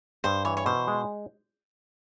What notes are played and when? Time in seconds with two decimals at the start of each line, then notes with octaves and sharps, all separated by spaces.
0.24 G2 C5
0.45 E3 C#5
0.57 C#5
0.66 B2 C5
0.88 G#3